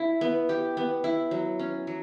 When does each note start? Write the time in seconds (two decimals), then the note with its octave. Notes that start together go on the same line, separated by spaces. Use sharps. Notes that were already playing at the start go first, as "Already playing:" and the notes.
Already playing: E4
0.21 B3
0.49 G4
0.77 B3
1.04 E4
1.31 F#3
1.59 C#4
1.87 F#3